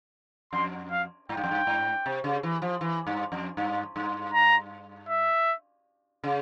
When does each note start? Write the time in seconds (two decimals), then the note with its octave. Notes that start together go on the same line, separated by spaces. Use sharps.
0.53 F2 C6
0.91 F5
1.29 G#2 G5
1.37 G2
1.44 F2
1.51 G2
1.67 G#2
2.06 C3
2.24 C#3
2.43 E3
2.62 F3
2.81 E3
3.07 G2
3.32 F2
3.57 G2
3.96 G2
4.34 A#5
5.09 E5
6.24 C#3